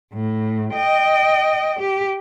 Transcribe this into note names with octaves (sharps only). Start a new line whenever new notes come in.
A2
D#5 G5
G4